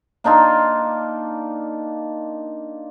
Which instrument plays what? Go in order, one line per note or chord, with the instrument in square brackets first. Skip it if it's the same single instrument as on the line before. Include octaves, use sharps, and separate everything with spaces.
[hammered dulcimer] A#3 D4 D#4 F4